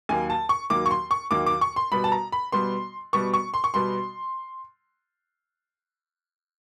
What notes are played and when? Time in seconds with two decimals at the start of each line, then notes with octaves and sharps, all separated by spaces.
0.09 D#2 D#3 F#3 A#3 G#5
0.30 A5
0.49 C#6
0.70 D#2 D#3 F#3 A#3 D6
0.86 C#6
0.91 C6
1.11 C#6
1.31 D#2 D#3 F#3 A#3 D6
1.46 D6
1.61 C#6
1.76 C6
1.92 B2 G3 B3 B5
2.04 A5
2.12 A#5
2.32 B5
2.52 B2 G3 B3 C6
3.13 B2 G3 B3 C#6
3.34 C#6
3.54 C6
3.64 C#6
3.74 B2 G3 B3 C6